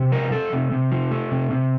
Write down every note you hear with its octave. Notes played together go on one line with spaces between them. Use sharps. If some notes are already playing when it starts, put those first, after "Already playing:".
Already playing: C3
F3 A#4
A3 A4
C3
C3
F3
A3
C3
C3